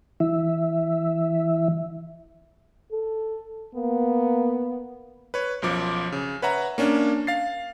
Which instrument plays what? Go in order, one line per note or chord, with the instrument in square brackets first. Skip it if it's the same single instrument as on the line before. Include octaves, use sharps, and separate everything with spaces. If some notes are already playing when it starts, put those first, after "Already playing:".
[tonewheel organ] E3 E5
[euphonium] A4
[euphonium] A#3 [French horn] B3
[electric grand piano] B4 C#5
B1 F#2 F3 D6
C#3
B4 C#5 E5 F#5 A#5
A#3 C#4 D4
F5 A6 C7